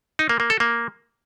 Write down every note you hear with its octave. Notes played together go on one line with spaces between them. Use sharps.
D#4
A#3
A#3
A4
A#3